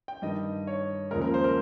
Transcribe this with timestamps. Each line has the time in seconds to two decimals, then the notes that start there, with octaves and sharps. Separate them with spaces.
0.08 G5
0.22 G2 D#3 G3 D#5
0.67 C#5
1.11 D#2 C#3 F3 G#3 A#4
1.22 A#4
1.34 C5
1.44 A#4